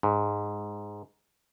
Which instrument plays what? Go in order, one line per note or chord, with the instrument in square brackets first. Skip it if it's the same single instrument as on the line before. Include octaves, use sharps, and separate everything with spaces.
[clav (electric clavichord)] G#2